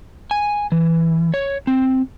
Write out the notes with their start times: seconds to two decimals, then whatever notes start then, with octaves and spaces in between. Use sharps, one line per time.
0.31 G#5
0.72 E3
1.34 C#5
1.67 C4